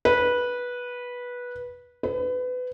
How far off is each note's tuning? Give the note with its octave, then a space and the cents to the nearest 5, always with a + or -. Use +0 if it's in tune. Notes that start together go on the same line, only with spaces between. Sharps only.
B4 -15
B4 +25